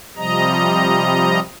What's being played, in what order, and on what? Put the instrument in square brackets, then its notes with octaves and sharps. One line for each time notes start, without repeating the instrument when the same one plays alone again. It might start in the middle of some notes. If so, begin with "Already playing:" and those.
[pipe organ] C3 F3 G3 D#5 A#5